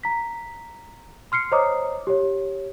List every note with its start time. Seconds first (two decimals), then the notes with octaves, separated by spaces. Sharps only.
0.03 A#5 B6
1.32 C6 F6 C7 C#7
1.52 C5 C#5 D#5 A#5 D6 D#6
2.07 G4 C#5